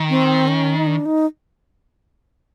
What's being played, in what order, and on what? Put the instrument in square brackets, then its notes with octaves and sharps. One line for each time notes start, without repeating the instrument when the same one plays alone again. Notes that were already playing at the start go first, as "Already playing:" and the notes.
Already playing: [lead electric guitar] D#3
[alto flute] C4
C#4
D#4
D4
D#4